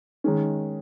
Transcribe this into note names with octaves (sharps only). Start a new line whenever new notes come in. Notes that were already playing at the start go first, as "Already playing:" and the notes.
D#3 G#3 C#4